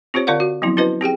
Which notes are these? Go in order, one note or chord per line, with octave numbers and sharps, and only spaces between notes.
C4 F4 G4 C5 C#5
D3 F4 A#4 D5 F5 F#5
F#4
F3 F#3 B3 C4 E4
C#4 E4 F#4 B4 C5 D#5
C4 G4 G#4 G5